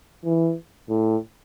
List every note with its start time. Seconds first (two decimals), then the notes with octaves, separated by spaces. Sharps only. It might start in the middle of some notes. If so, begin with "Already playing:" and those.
0.25 E3
0.90 A2